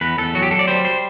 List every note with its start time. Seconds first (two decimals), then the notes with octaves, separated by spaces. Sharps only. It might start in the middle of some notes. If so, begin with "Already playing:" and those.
0.01 E2 B4
0.18 E2 A4
0.35 F#3 F#4
0.42 G4
0.51 F#3 A4
0.59 D5
0.68 G3 C5
0.85 C5